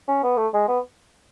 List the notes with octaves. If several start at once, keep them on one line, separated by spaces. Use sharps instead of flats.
C#4
B3
A3
G#3
B3